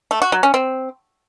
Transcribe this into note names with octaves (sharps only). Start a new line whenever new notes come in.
A3
F#4
F#3
C#4
C4